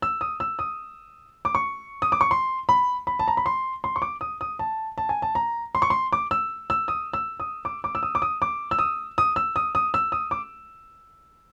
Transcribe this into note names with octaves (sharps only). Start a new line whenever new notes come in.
E6
D#6
E6
D#6
D6
C#6
D#6
D6
C#6
C6
B5
B5
A5
A#5
B5
C6
C6
C#6
D6
D#6
D#6
A5
A5
G#5
A5
A#5
C6
C#6
C6
D6
E6
E6
D#6
E6
D#6
D6
D6
E6
D#6
D6
D#6
D6
E6
D#6
D#6
E6
D#6
D#6
E6
D#6
D6